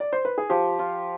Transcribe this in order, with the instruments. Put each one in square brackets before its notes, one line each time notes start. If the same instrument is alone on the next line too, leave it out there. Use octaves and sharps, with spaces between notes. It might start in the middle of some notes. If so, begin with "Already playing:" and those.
[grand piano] D5
C5
B4
G#4
[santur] F3 [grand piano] G4
[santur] F4